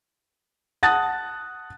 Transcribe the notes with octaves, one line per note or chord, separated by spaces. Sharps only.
F#5 A5 D#6 F#6 A6